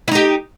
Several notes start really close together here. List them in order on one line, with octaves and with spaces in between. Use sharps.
E4 D#4 G4